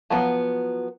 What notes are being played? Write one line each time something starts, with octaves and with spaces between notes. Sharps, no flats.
F3 F#3 B3